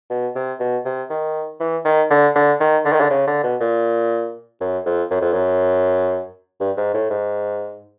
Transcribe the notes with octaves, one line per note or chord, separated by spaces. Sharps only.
B2
C3
B2
C3
D#3
E3
D#3
D3
D3
D#3
D3
D#3
D3
C#3
D3
B2
A#2
F#2
F2
F#2
F2
F#2
G2
G#2
A2
G#2